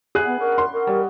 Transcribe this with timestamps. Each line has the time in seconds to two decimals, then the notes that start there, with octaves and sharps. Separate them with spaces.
0.15 G3 B3 E4 G#4 F#6
0.27 B3 F#5
0.40 C#4 D4 A#4 G5
0.58 C6
0.73 F#4 A#4 D#5
0.87 G3 C#5 D#5